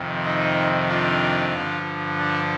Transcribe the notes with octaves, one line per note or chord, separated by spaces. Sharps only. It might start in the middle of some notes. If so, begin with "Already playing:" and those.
Already playing: F2 C3 D#3
D#4
D4 F4
G2 D3 F3
D4